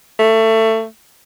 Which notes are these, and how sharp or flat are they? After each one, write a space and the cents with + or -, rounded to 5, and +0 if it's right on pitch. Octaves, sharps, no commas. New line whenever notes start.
A3 +20